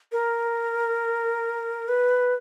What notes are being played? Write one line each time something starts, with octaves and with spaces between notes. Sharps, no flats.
A#4
B4